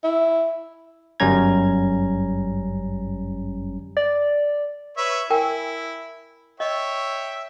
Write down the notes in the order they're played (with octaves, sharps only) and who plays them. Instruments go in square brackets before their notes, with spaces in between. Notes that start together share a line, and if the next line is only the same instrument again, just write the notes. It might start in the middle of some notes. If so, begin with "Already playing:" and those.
[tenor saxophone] E4
[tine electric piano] G1 F#2 G3 C#4 A#5 G#6
[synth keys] D5
[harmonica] B4 C#5 E5
[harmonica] E4 [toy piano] A#4 G5 G#5
[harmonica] C#5 E5 G5 [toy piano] D#5